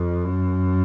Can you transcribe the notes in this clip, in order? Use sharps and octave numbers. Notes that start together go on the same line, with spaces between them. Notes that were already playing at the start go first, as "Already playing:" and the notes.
Already playing: F2
F#2